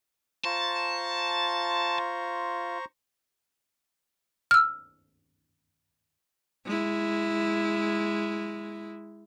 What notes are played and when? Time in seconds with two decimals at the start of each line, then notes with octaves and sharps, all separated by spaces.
0.45 F4 C5 A5 A#5 C#6
4.51 E6 F6
6.66 G#3 E4